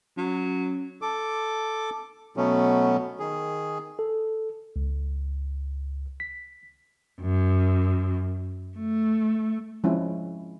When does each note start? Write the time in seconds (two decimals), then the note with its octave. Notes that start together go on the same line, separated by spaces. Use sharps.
0.18 F#3 C#4
1.02 A4 D6
2.37 B2 F#3 A3 B3 C#4
3.20 D#3 G#4
3.99 A4
4.76 C#2
6.20 B6
7.21 F#2
8.77 A3
9.84 F3 G#3 C4 C#4 E4